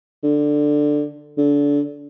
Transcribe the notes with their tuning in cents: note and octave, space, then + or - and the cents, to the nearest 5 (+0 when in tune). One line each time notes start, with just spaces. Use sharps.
D3 +10
D3 -25